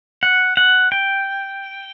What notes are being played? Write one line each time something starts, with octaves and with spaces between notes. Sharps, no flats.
F#5
F#5
G5